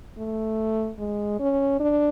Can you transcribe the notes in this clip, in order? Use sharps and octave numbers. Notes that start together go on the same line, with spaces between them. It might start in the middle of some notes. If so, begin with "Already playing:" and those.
A3
G#3
C#4
D4